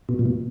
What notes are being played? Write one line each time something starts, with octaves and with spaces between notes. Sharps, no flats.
B2
A#2
B2